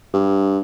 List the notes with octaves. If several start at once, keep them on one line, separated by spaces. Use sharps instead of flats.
G2